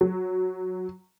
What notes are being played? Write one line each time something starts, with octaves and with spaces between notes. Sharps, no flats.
F#3